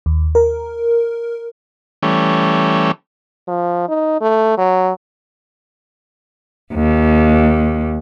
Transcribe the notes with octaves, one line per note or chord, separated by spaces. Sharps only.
D#2
A#4
E3 G3 A3 C#4
F3
D#4
A3
F#3
D#2